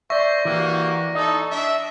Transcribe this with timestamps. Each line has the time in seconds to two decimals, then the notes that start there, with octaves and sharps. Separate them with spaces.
0.10 C5 D5 E5 C#6 A#6
0.45 E3 A#3 F#4 G4
1.15 D#4 E4 A4 D#5
1.51 D4 E5